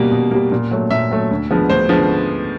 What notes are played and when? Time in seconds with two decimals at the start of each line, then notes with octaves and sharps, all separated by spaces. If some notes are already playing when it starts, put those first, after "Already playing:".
Already playing: B2 G3 A#3
0.12 B2
0.31 G3 A#3
0.52 A#2
0.71 F#3 A3
0.91 A#2 E5
1.11 F#3 A3
1.31 D2
1.50 D3 F3 G#3 B3
1.70 D2 C5
1.89 D3 F3 G#3 B3